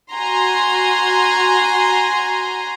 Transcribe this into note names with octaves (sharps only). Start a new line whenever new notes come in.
F#4 G#5 A#5 C6